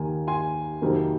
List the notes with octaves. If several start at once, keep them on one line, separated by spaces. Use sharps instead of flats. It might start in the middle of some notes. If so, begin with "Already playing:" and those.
Already playing: D#2 D#3 A#3 G#5
G#5 C6
F2 C3 D#3 F#3 A#3